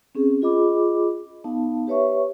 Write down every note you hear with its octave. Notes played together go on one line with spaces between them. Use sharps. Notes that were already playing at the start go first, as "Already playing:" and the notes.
C4 C#4 G#4
F4 G#4 D#5 B5 D6
B3 D#4 F5 A5
G4 B4 C#5 E5 C#6